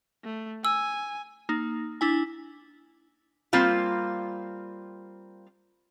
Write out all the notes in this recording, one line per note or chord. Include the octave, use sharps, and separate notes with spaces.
A3
G#5 E6
A#3 D#4
D4 E4 G#5
G3 A#3 C4 F4